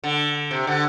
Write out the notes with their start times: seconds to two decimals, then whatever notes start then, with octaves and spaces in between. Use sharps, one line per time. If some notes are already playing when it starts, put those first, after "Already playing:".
0.04 D3
0.51 C3
0.67 D3